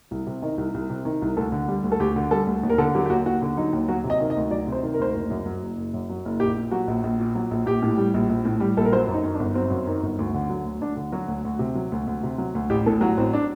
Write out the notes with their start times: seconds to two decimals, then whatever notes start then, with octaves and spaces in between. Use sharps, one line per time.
0.11 C2
0.27 C3
0.42 D#3 D#5
0.58 C2
0.74 C2
0.90 C3
1.05 D#3
1.22 C2
1.37 D2 A4
1.52 D3
1.68 G3
1.84 D2
1.92 A4
2.00 D2 G4
2.16 D3
2.31 G3 A4
2.47 D2
2.63 D#2
2.69 A#4
2.78 D3 A4
2.95 F#3 G4
3.06 G4
3.09 D#2 F#4
3.26 D#2 F#4
3.42 D3
3.57 F#3 D#4
3.73 D#2
3.88 F#3 F#4
4.04 C3
4.10 D#5
4.20 D#3
4.30 D#5
4.36 D2
4.51 F#3 D5
4.67 C3
4.72 C5
4.83 D#3
4.94 A#4
4.99 D2 C5
5.10 F#1 A#4
5.30 F#2
5.46 F#3
5.62 F#1
5.77 F#1
5.94 F#2
6.09 F#3
6.25 F#1
6.40 A#1 G4
6.57 A#2
6.71 F#3 F#4
6.88 A#1
7.03 A#1
7.20 A#2
7.35 F#3
7.51 A#1
7.66 A#1 G4
7.82 A2
7.97 G3
8.14 A#1
8.29 A#1
8.45 A2
8.60 G3
8.77 A#1 A4
8.85 A#4
8.92 F#3 C5
9.08 F#2
9.13 D#4
9.24 D#3
9.35 D4
9.39 G1
9.55 F#3 C4
9.70 F#2
9.87 D#3
10.03 G1
10.19 D2
10.34 D3
10.50 F#3
10.65 D2
10.81 D2 D4
10.97 D3
11.12 F#3 F#4
11.28 D2
11.45 D2
11.59 C3
11.75 F#3
11.92 D2
12.07 D2
12.23 C3
12.38 F#3
12.55 D2
12.70 A1 G4
12.86 A2 A4
13.01 F#3 F#4
13.17 A1 C4
13.33 D4